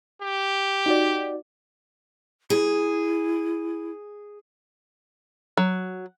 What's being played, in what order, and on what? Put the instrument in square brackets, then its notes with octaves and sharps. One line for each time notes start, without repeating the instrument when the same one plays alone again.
[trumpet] G4
[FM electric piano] D#4 F#4 D5
[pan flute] E4 [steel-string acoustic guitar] G#4
[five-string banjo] F#3